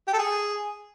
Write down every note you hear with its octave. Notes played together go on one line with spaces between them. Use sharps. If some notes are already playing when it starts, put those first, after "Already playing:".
G4
A4
G#4